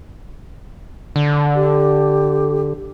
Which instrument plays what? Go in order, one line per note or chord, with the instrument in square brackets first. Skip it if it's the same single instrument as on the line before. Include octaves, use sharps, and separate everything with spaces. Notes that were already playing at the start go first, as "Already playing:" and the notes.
[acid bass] D3
[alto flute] G4